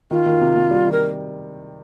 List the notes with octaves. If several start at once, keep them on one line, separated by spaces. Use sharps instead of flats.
D#3 F4
D#3
C3
C3
G3
D#3
A#4